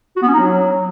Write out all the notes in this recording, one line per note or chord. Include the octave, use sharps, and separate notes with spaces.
F#4
B3
C#4
D#4
F#3